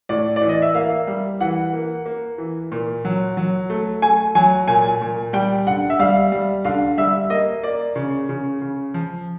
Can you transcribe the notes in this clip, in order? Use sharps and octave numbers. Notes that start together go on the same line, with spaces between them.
A2 D5
D5
E3
D#5
E5
A#3 F5
G3
E3 F#5
A#3
A#3
E3
A#2
F#3
F#3
A3
A3 G#5
F#3 G#5
A#2 G#5
A#2
G3 G5
D3 F#5
E5
G3 F5
G3
D3 F5
G3 E5
A#3 D#5
A#3 D5
C#3
C#3
C#3
F3